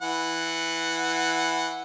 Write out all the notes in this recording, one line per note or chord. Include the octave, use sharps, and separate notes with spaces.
E3 F#5